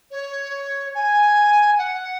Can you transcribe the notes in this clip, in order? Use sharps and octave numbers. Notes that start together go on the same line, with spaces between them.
C#5
G#5
F#5